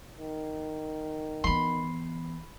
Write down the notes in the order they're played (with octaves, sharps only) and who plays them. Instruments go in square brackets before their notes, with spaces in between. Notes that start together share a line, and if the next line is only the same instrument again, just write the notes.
[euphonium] D#3
[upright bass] E3 B3 [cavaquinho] B5 C6